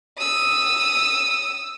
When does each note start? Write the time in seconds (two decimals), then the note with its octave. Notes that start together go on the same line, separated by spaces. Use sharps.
0.18 D#6 E6